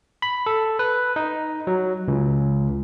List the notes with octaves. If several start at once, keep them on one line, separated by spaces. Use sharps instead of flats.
B5
A4
B4
D#4
F#3
C#2